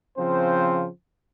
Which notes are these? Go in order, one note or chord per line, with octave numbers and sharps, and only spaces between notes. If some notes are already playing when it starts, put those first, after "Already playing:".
C#3 F3 C4 C5